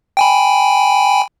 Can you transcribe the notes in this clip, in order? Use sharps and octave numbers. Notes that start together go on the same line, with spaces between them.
G5 G#5 B5